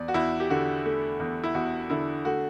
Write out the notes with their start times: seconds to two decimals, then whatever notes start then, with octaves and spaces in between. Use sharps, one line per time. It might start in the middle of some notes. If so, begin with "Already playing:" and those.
Already playing: E2 D5
0.08 F#4
0.14 E2 E4
0.40 G4
0.50 D3 F#4
0.85 A3
1.20 E2
1.44 E4
1.54 E2 F#4
1.90 D3 E4
2.25 A3 F#4